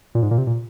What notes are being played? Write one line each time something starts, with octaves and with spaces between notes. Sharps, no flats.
A#2
G#2
A#2
C3
A#2